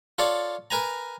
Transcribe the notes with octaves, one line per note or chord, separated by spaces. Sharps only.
F4 A4 C#5 D5
A#4 B4 G#5 A#5